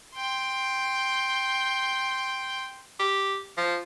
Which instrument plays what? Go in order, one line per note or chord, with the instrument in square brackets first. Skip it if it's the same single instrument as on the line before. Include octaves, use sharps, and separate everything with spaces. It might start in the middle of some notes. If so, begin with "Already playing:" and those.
[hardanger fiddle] G5 C6
[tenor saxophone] G4
F3